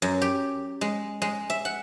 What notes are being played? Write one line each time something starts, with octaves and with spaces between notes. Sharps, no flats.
F#2
G4
G#3
G#3
E5
F#5